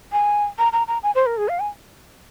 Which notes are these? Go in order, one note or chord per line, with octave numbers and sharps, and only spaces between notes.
G#5
A#5
A#5
A#5
G#5
C5
A#4
G#4
F5
G#5